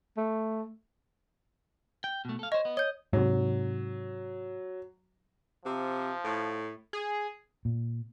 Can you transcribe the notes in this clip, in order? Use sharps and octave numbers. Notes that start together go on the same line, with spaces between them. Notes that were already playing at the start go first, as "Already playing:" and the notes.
A3
G5
B2 A3
A4 F5
C5 C#5 D#5
B3
C#5 D#5 G6
G#2 C3 F#3
C3 F3
A2
G#4
A#2